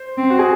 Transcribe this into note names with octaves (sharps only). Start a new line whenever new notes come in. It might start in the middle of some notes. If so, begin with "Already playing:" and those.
Already playing: C5
C4
F#4
G#4